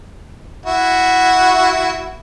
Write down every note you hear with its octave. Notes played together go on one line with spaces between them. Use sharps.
E4 F#4